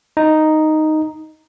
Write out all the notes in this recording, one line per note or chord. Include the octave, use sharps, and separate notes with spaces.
D#4